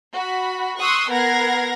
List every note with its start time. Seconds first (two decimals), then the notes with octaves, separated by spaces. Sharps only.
0.13 F#4 B5
0.80 C6 C#6 D#6 E6 F#6
1.09 B3 A#4 F#5 G#6 A#6 C7